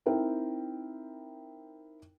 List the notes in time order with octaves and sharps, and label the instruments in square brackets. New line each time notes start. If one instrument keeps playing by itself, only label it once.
[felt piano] C4 D#4 E4 A#4 G5